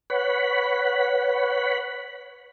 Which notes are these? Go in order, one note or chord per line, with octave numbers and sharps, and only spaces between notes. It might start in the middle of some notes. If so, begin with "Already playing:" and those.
B4 C#5 F#5 B5